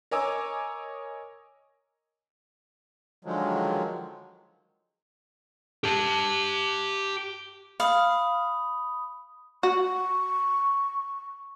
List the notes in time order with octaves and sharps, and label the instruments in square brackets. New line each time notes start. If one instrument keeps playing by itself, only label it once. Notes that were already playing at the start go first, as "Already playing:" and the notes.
[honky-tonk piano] A#4 C#5 D#5 G#5 D6 E6
[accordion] D3 D#3 F3 F#3 G#3
[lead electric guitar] G4 A5
[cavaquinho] F5 [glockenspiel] B5 D#6
[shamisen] F#4 [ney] C#6